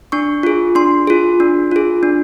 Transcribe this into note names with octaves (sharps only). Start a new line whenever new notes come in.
D4 C#6
F4 G#4
D4 C6
F4 G#4
D4
F4 G#4
D4